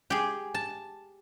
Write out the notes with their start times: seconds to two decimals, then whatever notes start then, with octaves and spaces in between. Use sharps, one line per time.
0.10 G4 G#4
0.54 A5